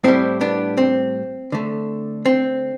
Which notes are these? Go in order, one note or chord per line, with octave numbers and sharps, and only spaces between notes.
A2 G3 C4 E4
B3 D4
C4
D3 A3
C4